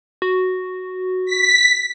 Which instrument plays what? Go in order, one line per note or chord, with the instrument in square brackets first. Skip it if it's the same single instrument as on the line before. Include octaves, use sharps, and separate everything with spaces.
[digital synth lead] F#4
[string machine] B6